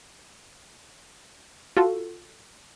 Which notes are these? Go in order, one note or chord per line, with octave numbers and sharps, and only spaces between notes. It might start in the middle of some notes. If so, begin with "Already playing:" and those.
F4 F#4 A4